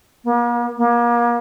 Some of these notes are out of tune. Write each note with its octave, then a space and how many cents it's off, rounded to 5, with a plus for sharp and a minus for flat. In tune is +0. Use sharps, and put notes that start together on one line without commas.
A#3 +40
A#3 +35